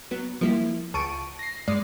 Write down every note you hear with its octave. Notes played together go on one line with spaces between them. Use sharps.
F#3 B3
F3 G3 A#3 E4
C#2 A5 C#6 D7 D#7
A#6 C7
G2 G#3 D5 C7